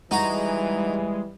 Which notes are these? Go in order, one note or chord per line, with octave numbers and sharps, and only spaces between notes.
E3 G3 G#3 D#4 F#4 A#5